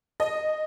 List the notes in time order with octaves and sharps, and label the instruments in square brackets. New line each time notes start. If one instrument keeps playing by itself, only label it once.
[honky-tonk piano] D#5